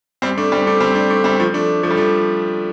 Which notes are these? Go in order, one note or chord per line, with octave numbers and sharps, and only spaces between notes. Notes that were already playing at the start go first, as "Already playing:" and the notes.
G3 C4
A3 D4
G3 C4
A3 D4
G3 C4
A3 D4
A3 D4
G3 C4
F3 A3
A3 D4
F3 A3
G3
F3 A3